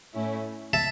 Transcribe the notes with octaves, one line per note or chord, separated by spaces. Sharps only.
A2 A3 C#4 E4
E5 A5